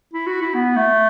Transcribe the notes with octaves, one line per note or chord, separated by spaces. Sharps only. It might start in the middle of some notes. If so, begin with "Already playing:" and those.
E4
F#4
E4
B3
A3